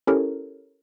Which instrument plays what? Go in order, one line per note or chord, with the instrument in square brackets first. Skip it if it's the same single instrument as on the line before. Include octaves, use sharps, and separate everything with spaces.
[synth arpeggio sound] C#4 E4 G4 A4 A#4 C#5